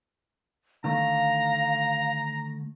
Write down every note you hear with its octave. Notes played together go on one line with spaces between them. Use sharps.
D3 D#3 A3 F5 A#5